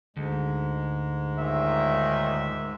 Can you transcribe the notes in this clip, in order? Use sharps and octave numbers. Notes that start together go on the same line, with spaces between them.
D2 G#2 G#3
D#2 A#2 D#3 E5